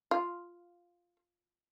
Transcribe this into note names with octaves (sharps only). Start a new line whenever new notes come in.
F4